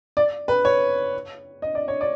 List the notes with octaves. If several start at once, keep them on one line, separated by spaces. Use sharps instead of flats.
D5
B4
C#5
D#5
D5
C#5
D5